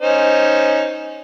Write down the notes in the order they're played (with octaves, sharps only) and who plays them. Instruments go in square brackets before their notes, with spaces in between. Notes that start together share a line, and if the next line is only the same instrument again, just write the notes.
[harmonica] C#4 D#4 C5